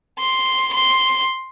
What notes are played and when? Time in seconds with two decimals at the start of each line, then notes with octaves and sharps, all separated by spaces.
0.19 C6
0.74 C6